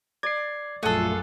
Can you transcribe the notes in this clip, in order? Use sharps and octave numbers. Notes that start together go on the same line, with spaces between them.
D5 G#6 C7
A#1 F#2 A3 F4 G#4 A4 F#5